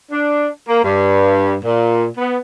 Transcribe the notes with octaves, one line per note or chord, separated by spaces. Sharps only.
D4
A#3
G2
A#2
B3